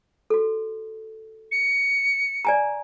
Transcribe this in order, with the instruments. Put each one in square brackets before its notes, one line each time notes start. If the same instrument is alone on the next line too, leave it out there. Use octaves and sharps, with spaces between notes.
[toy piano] F#4 A4
[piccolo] C#7
[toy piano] D5 G#5 A#5